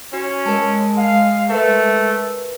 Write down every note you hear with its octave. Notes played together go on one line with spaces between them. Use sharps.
C#4 F#4
G#3 A#4 G#5 A5
F5
A3 A#4 B4